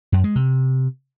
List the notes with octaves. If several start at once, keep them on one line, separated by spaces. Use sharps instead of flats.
F#2
G#3
C3